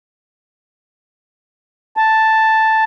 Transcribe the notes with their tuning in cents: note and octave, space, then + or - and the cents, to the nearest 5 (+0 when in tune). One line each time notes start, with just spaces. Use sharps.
A5 +0